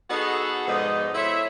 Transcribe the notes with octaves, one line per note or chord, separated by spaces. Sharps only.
B3 D#4 F#4 G#4 A4
G#2 B2 F3 D#4 D5 D#5
E4 A4 C5 C#5 E5